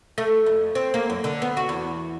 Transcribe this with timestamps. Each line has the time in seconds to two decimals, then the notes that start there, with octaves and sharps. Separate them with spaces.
0.18 A3
0.46 F2
0.75 C4
0.94 A#3
1.10 F#2
1.24 D3
1.42 B3
1.57 F#4
1.69 E2